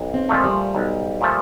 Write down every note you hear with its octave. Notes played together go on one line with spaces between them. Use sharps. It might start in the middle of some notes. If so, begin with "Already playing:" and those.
Already playing: B1
C4
A#2 F3 G#3 A3
G3
B1
A#2 F3 A3